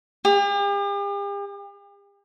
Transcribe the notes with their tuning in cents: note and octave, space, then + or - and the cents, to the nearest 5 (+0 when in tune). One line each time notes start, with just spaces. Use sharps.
G4 +45